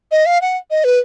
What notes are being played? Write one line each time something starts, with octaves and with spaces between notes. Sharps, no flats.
D#5
F5
F#5
D#5
B4